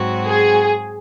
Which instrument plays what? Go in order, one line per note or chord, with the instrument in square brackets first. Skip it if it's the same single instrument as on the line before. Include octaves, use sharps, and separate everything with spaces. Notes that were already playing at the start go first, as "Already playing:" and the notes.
Already playing: [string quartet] G#2 F#3 C4 F#4
[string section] G#4